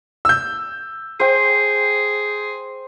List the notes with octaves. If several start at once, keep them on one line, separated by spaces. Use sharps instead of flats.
E6 G6
G#4 C5 G5